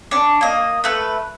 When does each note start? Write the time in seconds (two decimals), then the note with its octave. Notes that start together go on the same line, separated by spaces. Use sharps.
0.11 D4 C#6
0.41 A#3 D#5
0.84 A3 B4